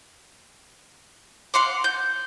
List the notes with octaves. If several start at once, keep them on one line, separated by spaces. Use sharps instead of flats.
F5 F#5 C6 D6
G6